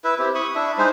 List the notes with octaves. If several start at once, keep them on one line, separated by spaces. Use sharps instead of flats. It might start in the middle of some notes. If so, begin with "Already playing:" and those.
E4 B4 E5
C4 E4 G4
B5 C#6 D#6
D4 E4 E5
G#3 D#4 C5